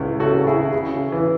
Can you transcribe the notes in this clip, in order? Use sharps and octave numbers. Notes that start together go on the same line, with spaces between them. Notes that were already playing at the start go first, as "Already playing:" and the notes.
Already playing: C#2 C#4 E4
F#4 A4
C#3
E4 G#4
C#3
E3